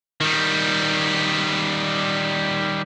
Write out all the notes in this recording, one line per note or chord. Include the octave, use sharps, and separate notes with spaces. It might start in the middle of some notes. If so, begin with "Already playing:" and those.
D#3 G3